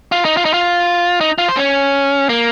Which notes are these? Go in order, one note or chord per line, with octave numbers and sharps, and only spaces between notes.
F4
D#4
F4
D#4
F4
D#4
F4
C5
C#4
A#3